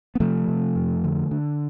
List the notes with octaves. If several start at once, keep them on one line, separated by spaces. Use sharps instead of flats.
B3
C3 F3 A3
C3
F2
D3
D3